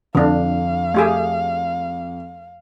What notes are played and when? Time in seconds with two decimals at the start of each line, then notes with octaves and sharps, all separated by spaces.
0.15 F2 D3 D4 F5
0.94 A3 G4 G#4